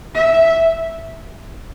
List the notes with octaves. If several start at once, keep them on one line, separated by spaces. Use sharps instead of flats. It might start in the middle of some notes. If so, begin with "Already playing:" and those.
E5